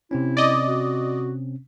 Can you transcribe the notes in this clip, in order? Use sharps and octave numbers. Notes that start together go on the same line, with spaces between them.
C3 C4 C#4 E4
D5 D#5
F#4